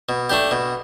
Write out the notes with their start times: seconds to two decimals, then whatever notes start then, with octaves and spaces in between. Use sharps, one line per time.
0.09 B2
0.30 A3 D4 G4
0.51 B2